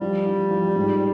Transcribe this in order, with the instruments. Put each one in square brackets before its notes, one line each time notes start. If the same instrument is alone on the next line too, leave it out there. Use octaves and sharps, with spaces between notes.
[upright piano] F3 [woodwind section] G3
[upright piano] F3
F3
G#2